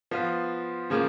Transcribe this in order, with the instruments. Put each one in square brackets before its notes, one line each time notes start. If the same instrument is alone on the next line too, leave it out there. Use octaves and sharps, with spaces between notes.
[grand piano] F3 B3 F4
C#3 F3 A#3